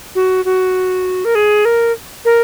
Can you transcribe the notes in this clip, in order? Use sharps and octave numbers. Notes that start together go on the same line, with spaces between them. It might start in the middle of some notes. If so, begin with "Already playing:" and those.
F#4
F#4
A#4
G#4
A#4
A#4